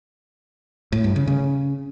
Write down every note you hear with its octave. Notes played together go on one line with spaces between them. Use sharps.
A2
G2
C#3
C#3